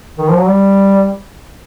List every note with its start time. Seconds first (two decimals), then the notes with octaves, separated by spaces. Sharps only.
0.18 D#3
0.29 F3
0.38 F#3
0.47 G3